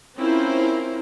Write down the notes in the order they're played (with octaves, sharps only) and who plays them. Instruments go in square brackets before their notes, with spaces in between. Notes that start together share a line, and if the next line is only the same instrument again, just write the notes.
[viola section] C4 C#4 E4 F4 A#4 C5